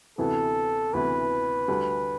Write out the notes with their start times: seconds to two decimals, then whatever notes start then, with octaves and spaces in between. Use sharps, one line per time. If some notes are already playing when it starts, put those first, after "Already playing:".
0.18 D2 C3 E3 B3 E4 A4
0.93 D2 C3 E3 B3 E4 B4
1.68 D2 D3 G3 D4